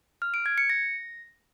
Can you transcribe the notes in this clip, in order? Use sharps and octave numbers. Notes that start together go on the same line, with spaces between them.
F6
D7
G#6
C#7
A#6